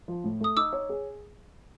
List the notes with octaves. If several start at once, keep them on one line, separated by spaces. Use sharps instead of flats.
F3
A2
A3 D#6
D#4 D6 E6
C#5
G#4